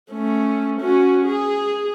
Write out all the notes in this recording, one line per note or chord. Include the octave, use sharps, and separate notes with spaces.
A3 C#4
C#4 F#4
G#4